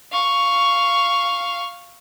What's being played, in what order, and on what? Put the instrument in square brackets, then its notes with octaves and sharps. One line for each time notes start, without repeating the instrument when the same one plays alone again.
[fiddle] F5 C#6